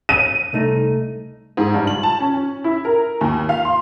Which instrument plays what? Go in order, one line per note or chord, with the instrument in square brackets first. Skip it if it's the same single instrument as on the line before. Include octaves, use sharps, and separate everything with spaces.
[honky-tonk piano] D#7
[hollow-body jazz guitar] C2 A3 D#4
[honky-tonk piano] G#2
G2
F#7
A5
C#4
C#4
E4
A#4
D#2
F5
C6